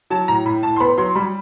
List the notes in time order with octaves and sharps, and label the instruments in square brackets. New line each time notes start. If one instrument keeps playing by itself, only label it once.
[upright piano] F#3 A5
A2 A#5
A2 B5
A2 A5
C6
B3 B5
F#3 C6
G3 B5